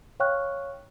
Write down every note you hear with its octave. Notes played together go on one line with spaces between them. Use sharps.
C#5 F5 G5 C#6 F6 F#6